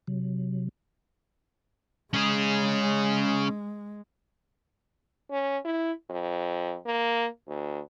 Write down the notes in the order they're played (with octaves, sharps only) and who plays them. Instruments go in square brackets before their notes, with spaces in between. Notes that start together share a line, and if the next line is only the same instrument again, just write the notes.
[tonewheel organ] C3 F#3
[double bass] G#3 [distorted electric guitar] C#4 G#4
[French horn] C#4
E4
F2
A#3
D2